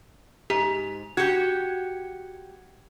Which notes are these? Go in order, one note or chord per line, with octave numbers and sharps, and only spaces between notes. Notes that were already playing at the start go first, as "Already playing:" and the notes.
G#2 G4
F#4 G4 G#6 C#7